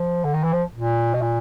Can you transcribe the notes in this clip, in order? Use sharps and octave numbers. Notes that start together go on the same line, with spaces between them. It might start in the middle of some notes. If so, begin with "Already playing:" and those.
Already playing: F3
D3
D#3
E3
F3
A#2
B2
A#2